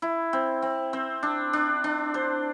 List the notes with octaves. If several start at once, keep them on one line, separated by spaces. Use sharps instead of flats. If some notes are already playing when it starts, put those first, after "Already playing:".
E4
C4
C4
C4
D4
D4
D4
C5